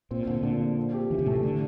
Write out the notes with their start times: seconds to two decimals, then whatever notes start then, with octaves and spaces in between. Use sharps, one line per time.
0.11 A#2 C4
0.27 A#2 D3
0.43 A#2 D3
0.60 F3
0.77 C4
0.94 G4
1.10 D3 E3
1.19 C3
1.26 A2 A3
1.36 C3
1.43 D3 D4